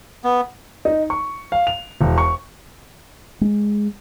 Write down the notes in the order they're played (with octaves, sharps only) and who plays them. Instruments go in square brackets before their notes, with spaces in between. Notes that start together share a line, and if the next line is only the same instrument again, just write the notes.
[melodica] B3
[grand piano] D#4
C#6
F5
F7
E1
C#6
[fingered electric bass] G#3